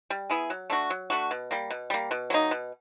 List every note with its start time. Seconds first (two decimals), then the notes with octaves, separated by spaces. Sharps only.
0.10 G3
0.30 B3 E4 G#4
0.50 F#3
0.70 A3 D4 F#4
0.90 F#3
1.10 A3 D4 F#4
1.31 B2
1.51 G3 A#3
1.70 B2
1.90 G3 A#3
2.11 B2
2.30 F#3 A#3 D#4
2.51 B2